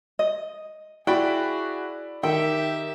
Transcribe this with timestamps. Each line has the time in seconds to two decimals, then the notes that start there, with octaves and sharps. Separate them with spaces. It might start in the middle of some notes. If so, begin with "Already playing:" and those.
0.19 D#5
1.07 E4 F#4 G#4 D5 G5 B5
2.23 D#3 G4 A4 E5 G5